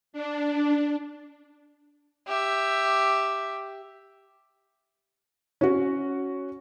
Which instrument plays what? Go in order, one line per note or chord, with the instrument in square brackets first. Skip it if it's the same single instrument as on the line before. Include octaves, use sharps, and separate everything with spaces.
[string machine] D4
[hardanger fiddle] G4 E5
[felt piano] C#4 F#4